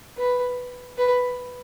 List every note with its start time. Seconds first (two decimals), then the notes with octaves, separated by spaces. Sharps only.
0.17 B4
0.98 B4